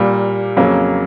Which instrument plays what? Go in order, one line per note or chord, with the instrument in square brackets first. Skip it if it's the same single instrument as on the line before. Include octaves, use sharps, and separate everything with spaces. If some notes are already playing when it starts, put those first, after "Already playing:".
Already playing: [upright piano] A#2 G3 A#3
F2 C#3 F#3 A#3 C#4